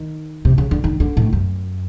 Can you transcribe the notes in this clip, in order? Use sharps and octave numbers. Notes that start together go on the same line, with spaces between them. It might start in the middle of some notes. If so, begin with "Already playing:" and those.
Already playing: D#3
C3
C#3
D3
D#3
D3
A2
F#2